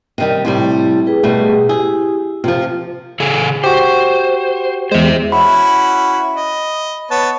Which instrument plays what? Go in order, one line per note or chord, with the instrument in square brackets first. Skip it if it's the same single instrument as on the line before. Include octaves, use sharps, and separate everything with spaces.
[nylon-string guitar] C3 D#3 G3
[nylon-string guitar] A2 C3 G3 [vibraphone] C4
[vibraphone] G#4 B4 G5
[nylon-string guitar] B2 G3 A3
[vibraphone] E4 G4 [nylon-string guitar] G#4
[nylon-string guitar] C3 F3 [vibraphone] F4
[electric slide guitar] C#3 G#4 A4
[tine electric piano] F#4 G4 [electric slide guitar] C5
[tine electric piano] E2 G#3 [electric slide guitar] C5 E5
[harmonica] C#4 E4 F#4 [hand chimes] B5
[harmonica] D#5
B3 C#5 A5